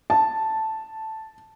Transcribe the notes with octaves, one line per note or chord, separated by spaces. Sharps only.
A5